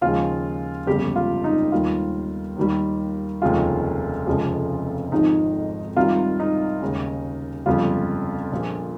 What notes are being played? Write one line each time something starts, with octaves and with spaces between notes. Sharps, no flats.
D#2 C#3 F3 G#3 F4
G1 F2 C#3 G3 G4
F4
D#4
D#2 D#3 G3 F4
D#2 D#3 G3
F1 D#2 C#3 G#3 F4
F1 F2 C#3 F3 G#3
G#1 G#2 F3 D#4
C2 C3 D#3 G3 F4
D#4
D#2 C#3 G#3
G1 F2 C#3 G3 F4
A#1 A#2 F3